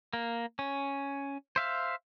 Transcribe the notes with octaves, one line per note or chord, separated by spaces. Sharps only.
A#3
C#4
C5 E5 F5